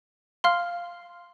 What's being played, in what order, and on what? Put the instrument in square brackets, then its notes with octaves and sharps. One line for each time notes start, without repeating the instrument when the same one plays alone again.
[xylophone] F5 C6 F6